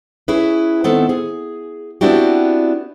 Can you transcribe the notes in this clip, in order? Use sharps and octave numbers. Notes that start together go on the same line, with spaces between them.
C#4 E4 G#4 B4
D#3 B3 C4 A4
G#4
B3 C4 D4 E4 F#4 G4